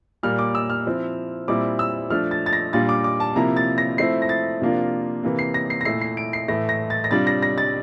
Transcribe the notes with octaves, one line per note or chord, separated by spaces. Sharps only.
A#2 G3 A#3 F6
D6
E6
F6
F3 C4 E4
A#2 G3 C4 E4 D6
E6
F3 A3 D4 F6
A6
A6
A#6
A#2 G3 D4 F4 A6
D6
D6
A5
C3 F3 A#3 E4 A#5
A6
A#6
F3 A3 C4 E4 C7
A#6
A6
C3 F3 A#3 D4 F4
C3 E3 A#3
C7
A#6
C7
A#6
A#2 A3 E4 C7
C7
D7
C7
A2 E3 A3 A#6
A#6
A6
A#6
C3 G3 D4 F4 A6
A#6
A#6
A6